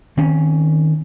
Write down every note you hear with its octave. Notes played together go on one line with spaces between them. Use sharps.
D#3 C4 C#4